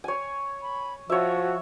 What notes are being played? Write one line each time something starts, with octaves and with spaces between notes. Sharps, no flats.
C#5 G#5
B5
F3 F#4 C#5 E5